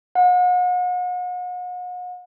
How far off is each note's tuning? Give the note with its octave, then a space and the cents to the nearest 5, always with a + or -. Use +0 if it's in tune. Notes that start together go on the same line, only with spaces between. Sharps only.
F#5 -40